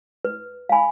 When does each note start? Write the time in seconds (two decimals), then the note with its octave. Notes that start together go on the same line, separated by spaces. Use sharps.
0.25 B4
0.69 F5 G#5 B5